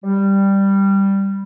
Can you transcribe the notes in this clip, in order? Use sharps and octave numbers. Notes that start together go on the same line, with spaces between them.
G3